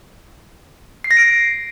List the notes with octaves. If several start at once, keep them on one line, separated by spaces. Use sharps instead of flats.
C7
A#6
D7